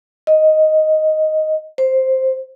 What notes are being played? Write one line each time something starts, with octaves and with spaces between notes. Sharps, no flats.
D#5
C5